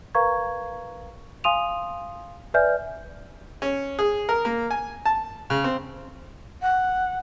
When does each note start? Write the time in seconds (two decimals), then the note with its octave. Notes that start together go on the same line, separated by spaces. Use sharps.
0.15 A#4 B4 F5 A#5 C#6 G#6
1.44 F5 G#5 C6 D#6 D#7 F7
2.54 B4 D5 E5 G#5 F6 G6
3.62 C#4
3.99 G#4
4.29 A#4
4.45 A#3
4.71 G#5
5.06 A5
5.50 C#3
5.64 C4
6.62 F#5